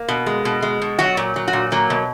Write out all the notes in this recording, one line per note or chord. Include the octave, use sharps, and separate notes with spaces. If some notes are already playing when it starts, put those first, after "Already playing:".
Already playing: A#3
B2
G#3
B2
G#3
B2
F#3 F#4
A#2
F#3
F#4
A#2
F#3 A#3
B2